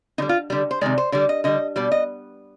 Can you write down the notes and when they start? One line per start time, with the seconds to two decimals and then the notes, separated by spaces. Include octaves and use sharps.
0.18 D3 G3 D#4
0.29 F4
0.50 D3 G3 G4
0.71 C5
0.81 C3 D#3 G#3 D5
0.98 C5
1.12 D3 G3 D5
1.29 D#5
1.44 D3 G3 D#5
1.76 B2 G3 D5
1.92 D#5